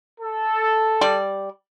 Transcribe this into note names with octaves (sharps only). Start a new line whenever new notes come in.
A4
G3 D5